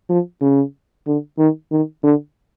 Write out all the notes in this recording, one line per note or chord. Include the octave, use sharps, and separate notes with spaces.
F3
C#3
D3
D#3
D#3
D3